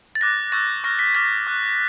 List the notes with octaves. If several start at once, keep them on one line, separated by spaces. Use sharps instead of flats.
A6
D6 F#6 A#6
C#6 E6 G6 A6
C#6 F6 A#6
B6
D6 F6 A6
D6 F#6